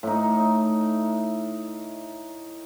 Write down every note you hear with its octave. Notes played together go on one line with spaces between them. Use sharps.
A2 D#4